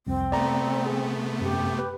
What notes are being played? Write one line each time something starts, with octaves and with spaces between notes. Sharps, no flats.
C2 F2 C4
C3 A3 B3 D5 A#5
G#4
F#2 G4
B4